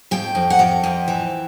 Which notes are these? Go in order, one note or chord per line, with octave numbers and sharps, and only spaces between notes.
F2 G5
F2
F#5
F2 G5
F2
E3